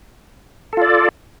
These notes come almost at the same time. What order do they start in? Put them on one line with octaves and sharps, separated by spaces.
A4 F4 D5